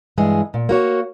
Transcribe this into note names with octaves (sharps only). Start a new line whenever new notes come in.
G2 E3 G#3 G#4
A#2
A#3 F#4 C#5